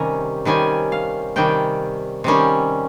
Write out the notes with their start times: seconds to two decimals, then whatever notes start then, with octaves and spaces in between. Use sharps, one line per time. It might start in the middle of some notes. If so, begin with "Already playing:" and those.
Already playing: C3 D#3 G3 C#4 G#5 A#5
0.45 C3 D#3 G3 C#4 G#5
0.92 F5
1.36 C3 D#3 G3 C#4 G5
2.24 C3 D#3 G3 C#4